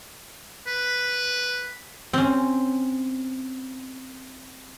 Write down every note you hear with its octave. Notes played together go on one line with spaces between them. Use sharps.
B4
C4 C#4